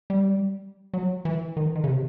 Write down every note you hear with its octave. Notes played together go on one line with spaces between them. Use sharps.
G3
F#3
E3
D#3
E3
D#3
C#3
C3